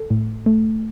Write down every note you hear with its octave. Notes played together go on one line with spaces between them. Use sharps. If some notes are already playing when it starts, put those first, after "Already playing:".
Already playing: A4
A2
A3